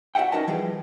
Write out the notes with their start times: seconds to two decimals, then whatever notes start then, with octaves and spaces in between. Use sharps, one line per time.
0.15 F#4 D5 E5 F#5 G5
0.32 C#4 D#4 F#4 A#4 D#5 A5
0.47 E3 F3 G3 G4 G#4